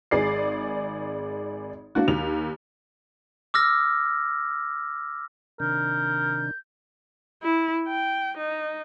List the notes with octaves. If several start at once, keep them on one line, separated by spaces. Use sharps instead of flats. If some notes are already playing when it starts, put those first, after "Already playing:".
G#1 G#4 D5 C7
A#3 D4 F#4
D#2 F7
D6 E6 F6 A#6
C3 D#3 D4 A#4 G6
E4
G5
D#4